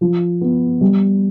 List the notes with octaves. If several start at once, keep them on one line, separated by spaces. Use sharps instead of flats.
F3
B3
G3